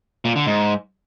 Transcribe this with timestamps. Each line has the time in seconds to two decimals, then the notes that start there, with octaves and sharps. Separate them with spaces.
0.25 A#2
0.36 D3
0.47 G#2